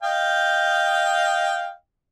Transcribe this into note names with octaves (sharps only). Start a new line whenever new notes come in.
D#5 F5 G5